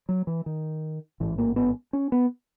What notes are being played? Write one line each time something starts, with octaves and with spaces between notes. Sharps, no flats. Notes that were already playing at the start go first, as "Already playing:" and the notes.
F#3
E3
D#3
A1 G#2 E3
A#3
B3
C#4
B3